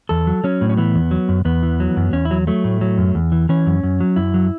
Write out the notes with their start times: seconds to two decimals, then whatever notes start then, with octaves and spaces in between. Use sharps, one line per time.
0.09 E2 A4
0.27 F#3
0.44 F#3 C#4
0.61 A2
0.69 C#4
0.77 E3 B3
0.95 E2
1.11 F#3
1.29 F#2
1.45 E2 B3
1.63 E3
1.80 F#3
1.97 F#2
2.13 E2 C#4
2.25 E4
2.31 F#3
2.47 F#3 A3
2.64 A2
2.81 F#3
2.98 F#2
3.15 E2
3.32 E3
3.49 E3 C#4
3.66 F#2
3.83 F#2
4.00 F#3
4.16 F#2 E4
4.34 F#3